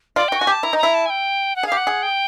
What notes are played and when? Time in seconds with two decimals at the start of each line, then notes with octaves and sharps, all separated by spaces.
0.16 F4 D5
0.28 F#4 G5
0.39 F#4 G#5
0.47 G4
0.52 A5
0.63 E4 A#5
0.73 D#4
0.78 A#5
0.83 E4
0.94 A5
1.06 G#5
1.10 G5
1.56 F#5
1.63 G#4
1.67 G4 F5
1.77 F#5
1.87 G#4
2.03 G5